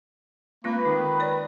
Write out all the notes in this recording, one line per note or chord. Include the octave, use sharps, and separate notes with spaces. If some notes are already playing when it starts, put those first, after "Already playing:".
G#3 A#3 C4 F4 B4
D#3 D#4
C#5 D5